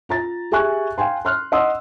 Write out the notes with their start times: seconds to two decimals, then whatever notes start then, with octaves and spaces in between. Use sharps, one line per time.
0.09 F4 A#5 A6
0.51 G4 G#4 E5 G#5 C#6 F#6
0.98 F5 G5 G#5 C6
1.25 C6 F6 F#6
1.52 D#5 F#5 C6 D#6 E6